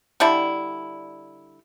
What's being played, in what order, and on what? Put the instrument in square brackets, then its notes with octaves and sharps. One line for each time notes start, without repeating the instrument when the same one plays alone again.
[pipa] D3 G3 D4 E4